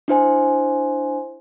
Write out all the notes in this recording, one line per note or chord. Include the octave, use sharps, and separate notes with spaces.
D4 E4 C5 G#5